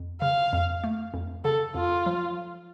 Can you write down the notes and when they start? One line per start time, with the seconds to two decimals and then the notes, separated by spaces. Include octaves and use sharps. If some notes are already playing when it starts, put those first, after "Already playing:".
Already playing: F2
0.21 C#3 F5
0.53 F2
0.84 A3
1.14 F2
1.44 C#3 A4
1.75 F2 F4
2.06 F3